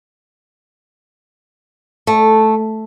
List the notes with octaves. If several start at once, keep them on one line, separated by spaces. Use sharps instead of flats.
A3